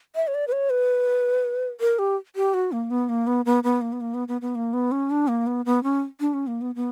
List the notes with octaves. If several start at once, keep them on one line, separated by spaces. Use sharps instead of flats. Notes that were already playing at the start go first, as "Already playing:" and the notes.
E5
C#5
D5
B4
C#5
B4
A#4
G4
G4
F#4
A#3
B3
A#3
B3
B3
B3
A#3
B3
A#3
B3
B3
B3
A#3
B3
C#4
D4
A#3
B3
B3
C#4
D4
C#4
A#3
B3
B3